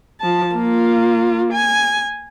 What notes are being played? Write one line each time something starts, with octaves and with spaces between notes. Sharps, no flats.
F3 A5
A#3 F4
G#5